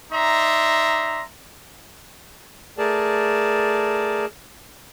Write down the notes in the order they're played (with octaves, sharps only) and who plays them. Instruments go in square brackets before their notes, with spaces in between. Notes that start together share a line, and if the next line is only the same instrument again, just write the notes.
[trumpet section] D#4 D5 E5 A#5 C6
[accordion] A3 G#4 A#4 D5 A5